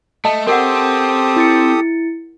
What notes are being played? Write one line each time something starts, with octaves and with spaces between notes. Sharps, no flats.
A3 D#5 A5 D#6
C4 G4 A4 A#4 F#5 D#6
E4 A6 C#7